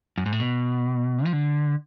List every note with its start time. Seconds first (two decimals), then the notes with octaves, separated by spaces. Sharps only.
0.18 F#2
0.26 G#2
0.32 A2
0.40 B2
1.25 F3
1.33 D3